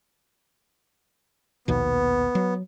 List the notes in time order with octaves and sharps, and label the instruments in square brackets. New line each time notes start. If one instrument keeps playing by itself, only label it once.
[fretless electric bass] A#1 D#2 B2 [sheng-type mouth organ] B3
[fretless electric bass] F#3